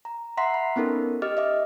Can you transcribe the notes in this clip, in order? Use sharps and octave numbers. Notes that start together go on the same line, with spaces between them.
A#5
E5 F#5 A#5 C6 B6 C7
B5
B3 C#4 D#4 A4 A#4
G4 D#5 D6 F6
D#5 E5 D6